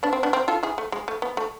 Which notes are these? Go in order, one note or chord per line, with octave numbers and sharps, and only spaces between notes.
B3 D4
C4
B3 D4
C4
F4 A4
E4 G#4
A3
G#3
A3
B3
A3